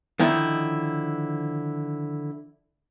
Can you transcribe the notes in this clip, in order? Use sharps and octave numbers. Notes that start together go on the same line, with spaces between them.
D3 D#3 F3 D#4 E4